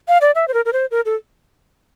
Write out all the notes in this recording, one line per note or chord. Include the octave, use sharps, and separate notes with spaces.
F5
D5
E5
C5
A#4
A#4
C5
A#4
A4